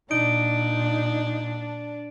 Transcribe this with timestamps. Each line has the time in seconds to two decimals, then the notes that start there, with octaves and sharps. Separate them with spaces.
0.11 A#2 D4 D#4 D7